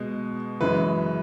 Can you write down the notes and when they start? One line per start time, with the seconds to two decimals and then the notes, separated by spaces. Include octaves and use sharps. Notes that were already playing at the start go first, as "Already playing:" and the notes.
Already playing: B2 G#3
0.61 F#2 C#3 E3 G#3 B4